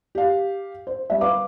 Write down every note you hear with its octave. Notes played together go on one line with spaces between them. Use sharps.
G4 F5
C5
G3 E5
B4 F5 D6